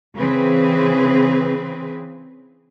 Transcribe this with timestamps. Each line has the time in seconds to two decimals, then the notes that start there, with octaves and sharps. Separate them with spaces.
0.16 C#3 E3 C4 G#4 B4